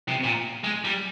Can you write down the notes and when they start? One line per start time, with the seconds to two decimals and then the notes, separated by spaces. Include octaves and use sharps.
0.09 C3
0.24 A#2
0.64 G#3
0.85 G3